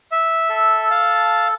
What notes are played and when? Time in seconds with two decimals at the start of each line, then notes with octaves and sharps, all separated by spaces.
0.12 E5
0.49 A4
0.90 F5 A5